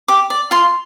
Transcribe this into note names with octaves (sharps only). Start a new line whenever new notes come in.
G4 D6
D5
F4 C6